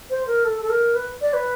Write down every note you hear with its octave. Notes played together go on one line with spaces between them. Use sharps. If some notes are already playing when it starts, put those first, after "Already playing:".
C5
A#4
A4
A4
A#4
B4
D5
B4